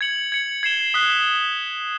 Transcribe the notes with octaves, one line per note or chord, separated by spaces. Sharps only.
G#6 C#7 F#7
G#6 C#7 F#7
G#6 C7 E7 G7
D#6 F#6 B6 E7 G7